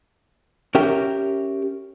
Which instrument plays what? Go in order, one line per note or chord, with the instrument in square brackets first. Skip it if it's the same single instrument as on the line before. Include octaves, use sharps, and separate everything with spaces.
[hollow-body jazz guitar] C#4 G4 A#4 E5 G5